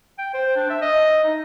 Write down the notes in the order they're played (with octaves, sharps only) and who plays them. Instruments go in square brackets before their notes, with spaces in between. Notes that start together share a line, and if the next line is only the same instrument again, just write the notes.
[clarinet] G5
C5
D4
E5
D#5
D#4